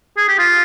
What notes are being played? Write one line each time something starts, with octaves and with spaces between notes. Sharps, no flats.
G#4
G4
F4